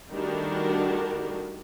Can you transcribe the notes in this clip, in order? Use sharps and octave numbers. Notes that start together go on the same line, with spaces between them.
D#3 G3 A3 D4 F#4 A#4